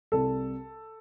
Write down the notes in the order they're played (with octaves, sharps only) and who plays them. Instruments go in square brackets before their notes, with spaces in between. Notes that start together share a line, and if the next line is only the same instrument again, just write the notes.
[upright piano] C2 A4